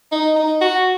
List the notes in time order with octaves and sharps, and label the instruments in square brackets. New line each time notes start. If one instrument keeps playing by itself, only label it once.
[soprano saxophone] D#4
D#4
F#4